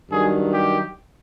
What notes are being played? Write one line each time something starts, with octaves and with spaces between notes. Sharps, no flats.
G2 D#3 F#3 G#4
G4